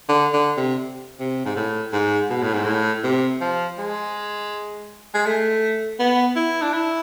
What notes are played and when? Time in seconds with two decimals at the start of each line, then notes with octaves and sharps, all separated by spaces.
0.09 D3
0.34 D3
0.57 C3
1.20 C3
1.45 G#2
1.56 A2
1.93 G#2
2.30 B2
2.42 A2
2.53 G#2
2.65 A2
3.03 C3
3.41 F3
3.78 G#3
5.14 G#3
5.26 A3
5.99 B3
6.36 E4
6.62 D4
6.73 E4